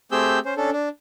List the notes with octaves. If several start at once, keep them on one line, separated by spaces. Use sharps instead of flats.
A3 C4 G4 G#4 E6 G6
C#4 C5
C#4 D4 A4
D4